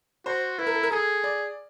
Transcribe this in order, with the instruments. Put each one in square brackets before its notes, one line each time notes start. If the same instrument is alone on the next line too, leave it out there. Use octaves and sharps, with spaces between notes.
[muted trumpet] F#4 [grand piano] C5
[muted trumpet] E4 [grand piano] B4
[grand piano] A#4
A4
A#4
[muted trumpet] G#4 [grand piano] A4
[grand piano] D5